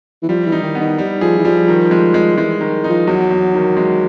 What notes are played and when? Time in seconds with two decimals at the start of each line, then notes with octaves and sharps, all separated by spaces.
0.23 E3
0.29 F3 G3
0.47 E3
0.52 D#4
0.63 D#3
0.75 B3
0.81 D#3
0.98 G3
1.21 F3 G#4
1.39 E3
1.45 F3 G3
1.68 D#3
1.91 G#3
2.14 G#3
2.37 E3 G#3
2.61 D#3
2.84 D#4
2.90 F3
3.07 E2 F#3
3.30 E2
3.54 D#3
3.77 G#3